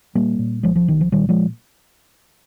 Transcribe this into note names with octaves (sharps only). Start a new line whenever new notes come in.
A#2 G3 A#3
A#2
C2 F3 G#3
F3
C2 D#3
F3
A#2 D#3 G3
F3 G#3